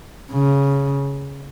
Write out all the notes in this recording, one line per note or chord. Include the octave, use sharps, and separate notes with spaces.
C#3